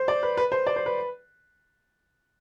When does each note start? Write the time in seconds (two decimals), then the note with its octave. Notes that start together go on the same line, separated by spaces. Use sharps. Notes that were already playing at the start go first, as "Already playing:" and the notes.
Already playing: C5
0.08 D5
0.23 B4
0.37 B4
0.52 C5
0.67 D5
0.76 C5
0.86 B4